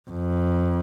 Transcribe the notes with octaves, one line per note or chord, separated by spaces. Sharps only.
F2